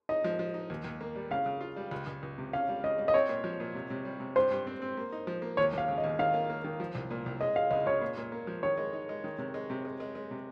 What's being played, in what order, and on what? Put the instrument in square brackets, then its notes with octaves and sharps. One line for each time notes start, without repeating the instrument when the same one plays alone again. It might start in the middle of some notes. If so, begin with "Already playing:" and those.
[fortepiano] D#4 [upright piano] D#5
[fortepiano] F3
F3
D#4
D#2
D#2
A#3
G3
[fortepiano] C#3 [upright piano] F5
[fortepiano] C#3
F4
G3
C#2
C#2
C#2
C3
[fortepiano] C#4 [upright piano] F5
[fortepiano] G3
[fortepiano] C#3 [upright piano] D#5
[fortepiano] G3
[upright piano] D#5
[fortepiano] C4 [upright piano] C#5
[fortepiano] A#2
F3
A#2
C3
C3
G3
C3
[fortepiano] G2 [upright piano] C5
[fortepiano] G2
C4
C4
A#3
D#4
F3
A#3
[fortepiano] D#2 [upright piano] C#5
[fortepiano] D#2 [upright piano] F5
[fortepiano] C#3
[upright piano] D#5
[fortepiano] D#2
[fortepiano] D#3 [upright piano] F5
[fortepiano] A#3
A#3
D#3
F3
C2
A#2
C2
[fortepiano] G#3 [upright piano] D#5
[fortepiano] G#3 [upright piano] F5
[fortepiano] C#2 [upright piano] D#5
[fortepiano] C#3 [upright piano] C#5
[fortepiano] A#2
A#2
A#3
F3
[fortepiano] D#3 [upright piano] C#5
[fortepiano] G#3
D#4
G#3
D#3
C3
G#3
C3
G#3
G#3
G#3
C3